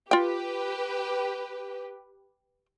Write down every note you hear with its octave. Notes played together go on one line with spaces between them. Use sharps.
F4 G4 B4 G5